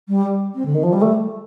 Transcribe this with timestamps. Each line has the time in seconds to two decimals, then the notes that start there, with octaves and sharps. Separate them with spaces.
0.09 G3
0.55 C4
0.66 D3
0.74 D#3
0.83 F3
0.93 G3
1.02 A3